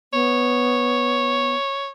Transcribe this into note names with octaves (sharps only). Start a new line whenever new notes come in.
B3 C#5